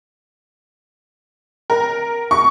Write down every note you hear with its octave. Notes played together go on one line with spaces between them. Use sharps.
A#4
C#6